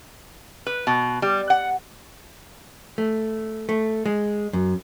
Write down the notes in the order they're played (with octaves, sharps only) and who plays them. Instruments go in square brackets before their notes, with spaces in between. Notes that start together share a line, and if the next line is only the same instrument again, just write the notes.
[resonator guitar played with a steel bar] B4
B2
G3
F#5
[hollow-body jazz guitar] A3
A3
G#3
F#2